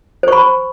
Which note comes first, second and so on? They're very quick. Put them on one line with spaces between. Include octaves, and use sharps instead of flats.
C5 C#6 B5